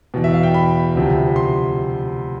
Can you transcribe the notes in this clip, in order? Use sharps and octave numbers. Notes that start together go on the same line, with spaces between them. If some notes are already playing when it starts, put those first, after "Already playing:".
E2 B2
E5
F5
G5
B5
D2 C3 F3
C6